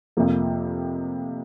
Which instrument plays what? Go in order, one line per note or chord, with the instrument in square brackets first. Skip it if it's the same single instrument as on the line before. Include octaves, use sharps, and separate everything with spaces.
[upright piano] F2 C3 F3 A#3